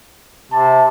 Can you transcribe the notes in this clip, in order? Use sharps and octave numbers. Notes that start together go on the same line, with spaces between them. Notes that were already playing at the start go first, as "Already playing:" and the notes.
C3 A5